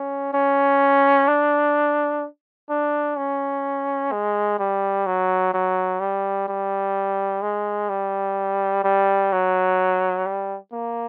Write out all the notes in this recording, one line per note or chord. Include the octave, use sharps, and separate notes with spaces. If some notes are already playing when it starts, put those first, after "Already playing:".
Already playing: C#4
C#4
D4
D4
C#4
G#3
G3
F#3
F#3
G3
G3
G#3
G3
G3
F#3
G3
A#3